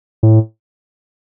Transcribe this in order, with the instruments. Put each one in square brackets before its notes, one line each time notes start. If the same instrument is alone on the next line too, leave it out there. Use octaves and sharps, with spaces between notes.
[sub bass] A2